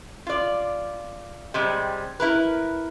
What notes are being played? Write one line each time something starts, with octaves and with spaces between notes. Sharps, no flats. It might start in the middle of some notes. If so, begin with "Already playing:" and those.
F4 D5
C3 G3 G#3
E4 A#4 B4